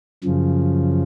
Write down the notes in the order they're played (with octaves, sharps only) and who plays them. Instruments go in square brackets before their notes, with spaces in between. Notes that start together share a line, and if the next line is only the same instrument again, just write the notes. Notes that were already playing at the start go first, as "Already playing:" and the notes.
[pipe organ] F#2 C#3 F3